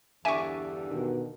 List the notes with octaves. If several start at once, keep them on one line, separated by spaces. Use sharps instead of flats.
E2 G2 D3 D5 E5 G#5 C#6
B2 D#3